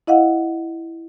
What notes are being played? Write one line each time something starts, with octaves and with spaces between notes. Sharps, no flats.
E4 D#5 F5 F#5